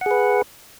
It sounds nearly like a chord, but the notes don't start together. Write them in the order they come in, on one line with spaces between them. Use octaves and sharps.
F#5 G#4 B4